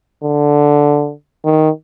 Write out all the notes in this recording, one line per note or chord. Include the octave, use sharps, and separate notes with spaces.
D3
D#3